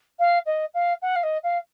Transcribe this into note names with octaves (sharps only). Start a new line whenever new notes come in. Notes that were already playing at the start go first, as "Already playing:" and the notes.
F5
D#5
F5
F#5
F5
D#5
F5